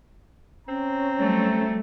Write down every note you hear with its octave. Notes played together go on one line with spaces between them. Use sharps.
C4 C#4 A#5
F#3 G3 A3